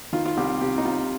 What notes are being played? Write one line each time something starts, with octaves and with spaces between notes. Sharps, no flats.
D#3 F4
F4
C2 G4
C3 G4
D#4
C2 F4